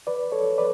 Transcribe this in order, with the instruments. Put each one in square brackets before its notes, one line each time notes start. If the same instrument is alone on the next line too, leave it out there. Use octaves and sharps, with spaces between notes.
[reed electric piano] B4 D5
A4 C#5
B4 D5